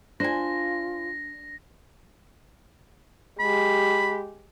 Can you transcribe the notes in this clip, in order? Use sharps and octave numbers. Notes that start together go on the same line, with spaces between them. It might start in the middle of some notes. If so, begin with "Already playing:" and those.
D4 F4 C5 G#5 A#6
G#3 G4 B5